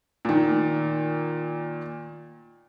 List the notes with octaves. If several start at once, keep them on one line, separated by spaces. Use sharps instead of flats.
A#2 D#3